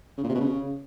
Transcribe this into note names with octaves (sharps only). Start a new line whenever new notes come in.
C#3
A#2
C3
B2
C#3